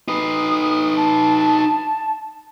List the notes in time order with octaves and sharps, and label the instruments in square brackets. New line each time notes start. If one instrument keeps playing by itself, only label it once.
[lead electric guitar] D#4 B4 [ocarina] D#6
[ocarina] A5